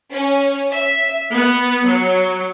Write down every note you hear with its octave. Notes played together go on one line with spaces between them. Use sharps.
C#4
E5
B3
F#3